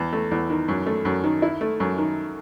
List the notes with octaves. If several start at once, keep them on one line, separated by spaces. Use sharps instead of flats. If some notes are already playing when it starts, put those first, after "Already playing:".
Already playing: E2
A3
E2
D#3
F#2
A3
F#2
D#3
E4
A3
F#2
D#3